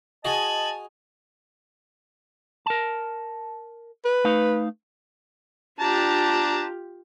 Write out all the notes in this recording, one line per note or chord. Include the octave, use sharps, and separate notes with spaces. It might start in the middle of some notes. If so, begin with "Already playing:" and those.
D#4 F#4 G#4 D#5 G#5 A5 F#7
A#4 A5
B4
A3 D#4 F5
D4 F4 G4 A5 A#5